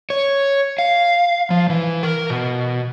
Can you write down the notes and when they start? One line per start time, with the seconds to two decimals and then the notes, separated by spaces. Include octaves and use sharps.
0.10 C#5
0.78 F5
1.50 F3
1.70 E3
2.03 A#4
2.30 B2